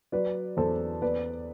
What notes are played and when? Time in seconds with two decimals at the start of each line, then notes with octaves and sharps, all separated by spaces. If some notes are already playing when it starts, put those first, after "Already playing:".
0.12 F#3 B4 D5
0.57 E2 A4 C5
1.02 B3 B4 D5